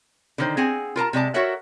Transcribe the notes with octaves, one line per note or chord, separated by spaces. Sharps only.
D3 D#3 C5
C4 G#4 F#5 G#5
F4 A#4 A5 A#5
C3 G#3 D5 A5
F#4 A4 A#4 C#5 E5 F#5